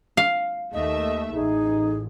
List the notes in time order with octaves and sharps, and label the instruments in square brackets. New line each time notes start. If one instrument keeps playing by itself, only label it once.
[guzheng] F5
[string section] D#2 A3 E5 [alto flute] D#5
[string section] A1 [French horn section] D#4 [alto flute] G#4